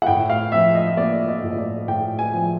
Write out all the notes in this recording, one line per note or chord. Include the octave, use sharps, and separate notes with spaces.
F#5
A2 G5
F5
F3 E5
D#5
A#3 D5
D#5
A2
D#5
D5
A2 G5
G#5
F3